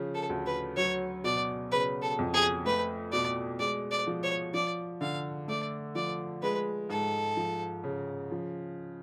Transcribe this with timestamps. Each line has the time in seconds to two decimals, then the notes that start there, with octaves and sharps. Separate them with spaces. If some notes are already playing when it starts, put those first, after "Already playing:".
Already playing: C#3 F3
0.15 A4
0.30 D2
0.46 B4
0.77 F#3 C#5
1.24 B2 D5
1.72 C#3 B4
2.02 A4
2.19 F2
2.34 G#4
2.65 A3 B4
3.12 B2 D5
3.59 G#3 D5
3.91 D5
4.07 F3
4.23 C#5
4.54 F3 D5
5.01 D3 F5
5.48 A3 D5
5.95 F3 D5
6.42 G#3 B4
6.89 G#2 A4
7.37 F3
7.84 C#3
8.31 F3